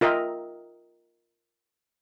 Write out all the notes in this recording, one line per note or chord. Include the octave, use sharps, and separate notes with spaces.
F4 A#4 D#5 E5 G5